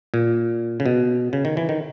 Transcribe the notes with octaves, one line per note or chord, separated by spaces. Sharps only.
A#2
C#3
B2
C#3
D#3
E3
D#3